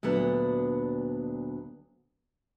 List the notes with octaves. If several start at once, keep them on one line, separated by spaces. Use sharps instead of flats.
D2 A#2 F#3 B3 D4